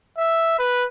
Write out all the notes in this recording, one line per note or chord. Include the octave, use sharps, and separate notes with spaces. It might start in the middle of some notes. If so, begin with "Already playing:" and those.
E5
B4